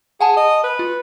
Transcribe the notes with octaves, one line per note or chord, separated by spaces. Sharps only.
G#4 F#5 G#5 A5
D#5
B4
F4